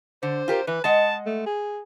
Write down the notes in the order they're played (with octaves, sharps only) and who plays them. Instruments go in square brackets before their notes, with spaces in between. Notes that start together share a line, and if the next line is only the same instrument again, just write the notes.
[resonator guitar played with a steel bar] D3 [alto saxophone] C5
[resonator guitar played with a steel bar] F4 G4 A#4
[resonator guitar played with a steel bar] E3 [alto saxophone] B4
[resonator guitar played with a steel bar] G#3 D#5 F#5 [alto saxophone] A5
[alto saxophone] A3
G#4